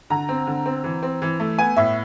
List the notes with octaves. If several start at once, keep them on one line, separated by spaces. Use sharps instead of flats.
D3 A#5
C4
D3
C4
E3
C4
E3
A3
B3 G#5
A2 E5